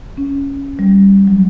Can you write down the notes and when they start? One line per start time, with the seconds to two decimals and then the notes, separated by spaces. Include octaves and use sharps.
0.17 C#4
0.79 G3
1.27 F#3